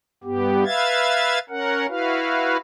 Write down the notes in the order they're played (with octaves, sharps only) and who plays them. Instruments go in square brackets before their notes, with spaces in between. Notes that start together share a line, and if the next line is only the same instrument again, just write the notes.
[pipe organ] G2 B3 G4
B4 E5 F5 G#6 A6
C#4 A#4 F#5
E4 F#4 B4 F5